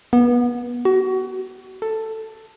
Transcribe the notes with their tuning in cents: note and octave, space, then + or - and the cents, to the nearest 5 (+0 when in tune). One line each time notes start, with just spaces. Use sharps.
B3 -25
F#4 +30
A4 +10